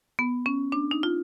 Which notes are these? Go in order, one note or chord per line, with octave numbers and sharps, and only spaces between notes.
B3
C#4
D4
D#4
F4